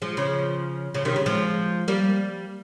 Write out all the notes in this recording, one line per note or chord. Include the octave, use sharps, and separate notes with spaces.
F3 G#3
C#3 F3
C#3 F3
C3 D#3
C#3
F3 G#3
G3 A#3